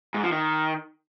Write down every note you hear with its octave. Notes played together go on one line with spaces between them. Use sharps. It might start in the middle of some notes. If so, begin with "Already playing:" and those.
G#2
F3
D#3